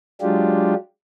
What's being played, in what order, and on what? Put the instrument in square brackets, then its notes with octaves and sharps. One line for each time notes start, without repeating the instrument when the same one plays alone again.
[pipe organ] F#3 G#3 D4 F4 G4